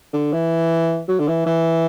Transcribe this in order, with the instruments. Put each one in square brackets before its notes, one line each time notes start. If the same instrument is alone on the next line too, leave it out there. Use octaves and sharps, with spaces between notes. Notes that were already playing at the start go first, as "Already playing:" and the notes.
[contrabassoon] D3
E3
F#3
D3
E3
E3